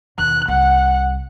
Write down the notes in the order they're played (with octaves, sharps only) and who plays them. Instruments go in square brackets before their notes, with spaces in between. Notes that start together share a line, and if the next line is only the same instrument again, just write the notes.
[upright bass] D#2 B2 [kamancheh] F#6
[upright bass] C2 [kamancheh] F#5